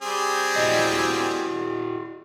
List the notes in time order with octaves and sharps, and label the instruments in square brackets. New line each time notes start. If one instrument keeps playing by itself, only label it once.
[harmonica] G3 C4 G#4
[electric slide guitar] E4 F#4 D#5